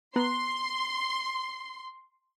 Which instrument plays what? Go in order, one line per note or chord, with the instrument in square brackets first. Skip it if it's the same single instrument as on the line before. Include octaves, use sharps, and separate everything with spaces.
[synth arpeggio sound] B3 A#5 F#6 [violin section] C6